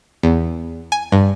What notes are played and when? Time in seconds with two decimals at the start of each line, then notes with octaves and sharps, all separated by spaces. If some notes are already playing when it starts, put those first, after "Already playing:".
0.23 E2
0.92 G#5
1.12 G2